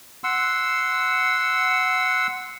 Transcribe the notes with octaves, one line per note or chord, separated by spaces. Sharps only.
F#5 C6 E6